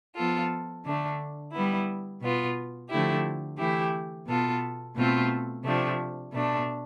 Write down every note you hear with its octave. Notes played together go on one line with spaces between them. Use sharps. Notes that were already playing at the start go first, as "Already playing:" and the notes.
F3 B3 F4 A4
D3 A3 D4
G3 B3 E4
B2 B3 F4
D3 F3 A3 E4 G4
E3 A3 E4 G4
B2 B3 F4 A4
B2 A3 C4 F4 A4
C3 F3 A3 D4
B2 A3 D4